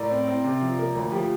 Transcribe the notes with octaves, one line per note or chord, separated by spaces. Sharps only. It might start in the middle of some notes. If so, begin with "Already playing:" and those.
Already playing: A2 A#4 D5
C4
C4
C3
F3
A#3
D2
F3 G4